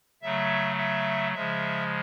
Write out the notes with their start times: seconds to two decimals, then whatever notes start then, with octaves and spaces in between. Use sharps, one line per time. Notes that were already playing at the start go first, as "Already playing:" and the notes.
0.22 C#3 F#3 A3 E5
0.78 E5
1.34 C#3 F3 G#3 E5